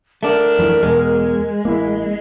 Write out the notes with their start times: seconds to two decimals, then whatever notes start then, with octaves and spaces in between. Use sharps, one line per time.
0.23 A3 D4 A#4
0.59 F#2 E3 F3
0.83 E2 B2 G#3
1.65 A1 A#3 E4